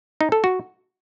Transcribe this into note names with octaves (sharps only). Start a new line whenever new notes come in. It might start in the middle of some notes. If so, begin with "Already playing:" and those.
D#4
A4
F#4